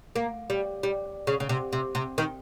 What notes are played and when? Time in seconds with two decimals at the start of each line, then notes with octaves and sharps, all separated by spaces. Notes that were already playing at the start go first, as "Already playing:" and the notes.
0.16 A#3
0.50 G3
0.83 G3
1.27 C#3
1.40 C#3
1.49 C3
1.73 C3
1.95 C3
2.18 D#3